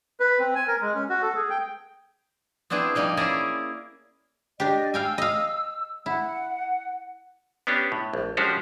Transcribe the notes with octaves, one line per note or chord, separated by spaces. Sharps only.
B4
C4
G#5
A#4
G#3
C#4
F#4
A4
G#4
G5
B3 C4 D4 E4 G#4
F3 G3 A#3 D#4
C#4 E4 G#4 A#4 D5
D4 G4 D5 D#5
F5 G5 G#5 E6
D#5 F5
E4 F#5
B3 C#4 D4 G4
A2
A#1
F3 G#3 C#4 D4 F#4 G4